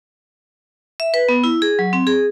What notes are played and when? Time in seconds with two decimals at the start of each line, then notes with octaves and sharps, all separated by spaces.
1.00 E5
1.14 B4
1.29 B3
1.44 E4
1.62 G#4
1.79 F#3
1.93 C4
2.07 G#4